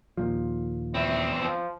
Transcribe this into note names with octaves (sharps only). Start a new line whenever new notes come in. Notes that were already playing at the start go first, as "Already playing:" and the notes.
D#2 A#2 F3
E2 C4 E4
F3